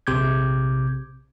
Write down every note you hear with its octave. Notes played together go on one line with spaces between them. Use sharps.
A#1 C3 D6 G6 G#6